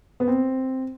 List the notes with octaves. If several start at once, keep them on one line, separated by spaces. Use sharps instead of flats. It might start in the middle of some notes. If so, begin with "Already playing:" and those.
B3
C4